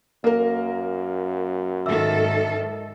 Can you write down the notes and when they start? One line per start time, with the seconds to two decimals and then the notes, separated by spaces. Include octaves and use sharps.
0.24 F#2 A#3 A#4
1.86 G#2 D#3 A4 E5 D6 E6